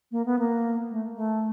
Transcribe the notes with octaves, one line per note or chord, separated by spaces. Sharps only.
A#3
B3
A#3
A3
A3